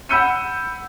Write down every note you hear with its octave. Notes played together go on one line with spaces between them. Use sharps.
F#5 B5 E6 G6 C#7 D#7